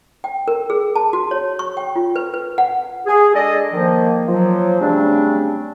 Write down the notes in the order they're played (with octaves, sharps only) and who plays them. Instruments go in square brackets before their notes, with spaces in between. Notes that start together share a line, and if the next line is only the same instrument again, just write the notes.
[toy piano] G5
A#4
G#4
A5
F#4
C#5
C#6
G5
F4
B4
B4
F#5
[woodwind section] G#4
G#3 D4 A4 D5 D#5
D#3 F3 A#3
F3 F#3
C#3 G3 A3 C4 D4